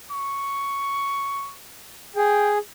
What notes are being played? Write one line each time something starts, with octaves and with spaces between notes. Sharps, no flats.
C#6
G#4 G5